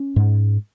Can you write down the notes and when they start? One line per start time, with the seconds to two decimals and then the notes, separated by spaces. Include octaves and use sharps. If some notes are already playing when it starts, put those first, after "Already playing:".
Already playing: C#4
0.16 G#2